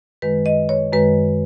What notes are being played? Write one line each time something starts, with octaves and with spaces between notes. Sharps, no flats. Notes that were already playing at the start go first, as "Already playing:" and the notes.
F#2 D#3 G#3 B4
D#5
C#5
F#2 D#3 G#3 B4